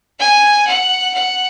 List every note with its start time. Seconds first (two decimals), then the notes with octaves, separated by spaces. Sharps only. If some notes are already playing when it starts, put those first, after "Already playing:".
0.19 G#5
0.67 F#5
1.15 F#5